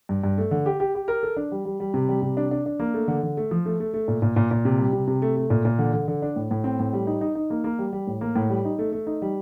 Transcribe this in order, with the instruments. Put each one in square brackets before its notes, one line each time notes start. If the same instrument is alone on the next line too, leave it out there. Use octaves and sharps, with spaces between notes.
[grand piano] G2
G2
A3
D3
G4
G4
G4
A#4
A4
D4
G3
G3
G3
C3
G3
C3
D4
D4
D4
A#3
A3
D3
D3
A3
F3
A3
A3
A3
A#2
A#2
A#2
A#2
C3
G3
C3
C3
A3
A3
A#2
A#2
D3
D3
D3
D4
A2
A2
C4
A2
G3
D#4
D#4
D#4
A#3
A#3
G3
G3
A2
A#3
A2
G3
D#4
A3
A3
D#4
G3